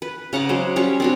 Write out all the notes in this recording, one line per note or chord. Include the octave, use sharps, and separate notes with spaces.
B4
C#3 F#5 A#5 D6
F#3 G#3 C5
G3 C#4 C#5
C4 D4 F#4